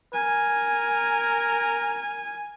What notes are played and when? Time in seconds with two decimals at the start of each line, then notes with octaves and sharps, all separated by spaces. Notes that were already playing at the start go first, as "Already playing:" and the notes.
0.14 A#4 G#5